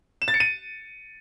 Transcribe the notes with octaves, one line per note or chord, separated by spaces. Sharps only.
E7
A6
C#7
D#7